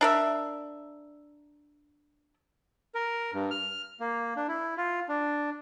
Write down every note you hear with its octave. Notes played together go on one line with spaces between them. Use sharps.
D4 A#4 E5
A#4
G2
F6
A#3
D4
E4
F4
D4